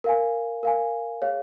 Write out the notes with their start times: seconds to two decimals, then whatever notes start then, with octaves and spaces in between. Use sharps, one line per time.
0.04 A#4 F5 G#5
0.63 A#4 F5 G#5
1.22 G#4 C#5 F5